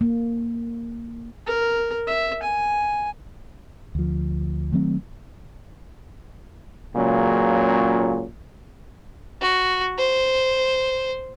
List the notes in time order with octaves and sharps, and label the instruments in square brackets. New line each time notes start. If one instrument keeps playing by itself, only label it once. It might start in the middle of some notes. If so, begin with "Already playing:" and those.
[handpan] A#3
[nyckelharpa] A#4
E5
G#5
[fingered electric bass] D2 F3
D#3 F#3 A3 C4
[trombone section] C#2 A#2 C#3 F#3
[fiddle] F#4
C5